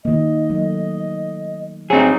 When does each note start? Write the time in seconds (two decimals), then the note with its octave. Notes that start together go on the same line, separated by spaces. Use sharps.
0.05 D#3 A#3 D#5
0.50 F#3 A3
1.90 F#3 G3 C4 D#4 G#4